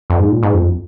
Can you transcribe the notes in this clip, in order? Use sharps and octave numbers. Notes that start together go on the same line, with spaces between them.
F2
G#2
A#2
G#2
F2